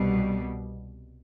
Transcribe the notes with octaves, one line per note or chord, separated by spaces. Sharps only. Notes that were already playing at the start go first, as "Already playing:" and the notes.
Already playing: C2 B2 G3